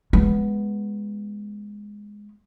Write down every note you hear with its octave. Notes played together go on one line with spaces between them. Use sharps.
G#3 B3